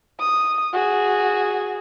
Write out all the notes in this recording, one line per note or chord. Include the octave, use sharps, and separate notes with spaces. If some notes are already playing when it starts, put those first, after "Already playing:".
D#6
F#4 G#4